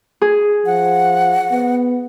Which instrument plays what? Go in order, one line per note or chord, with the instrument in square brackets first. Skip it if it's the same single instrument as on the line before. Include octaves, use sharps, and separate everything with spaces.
[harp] G#4
[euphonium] F3 [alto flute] F#5
[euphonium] B3